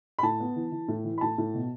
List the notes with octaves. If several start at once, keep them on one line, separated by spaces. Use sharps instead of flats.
B5
A2 A5
B3
E3
E3
A2
E3
B5
A2 A5
A2
B2